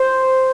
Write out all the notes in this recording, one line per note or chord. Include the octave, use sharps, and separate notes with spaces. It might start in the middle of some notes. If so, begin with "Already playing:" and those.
Already playing: C5